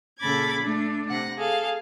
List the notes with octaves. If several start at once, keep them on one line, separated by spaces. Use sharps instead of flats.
A#2 C#3 A4 B5 D6 G#6
A3 D4
C3 F#5 A#6
G#4 A4 F5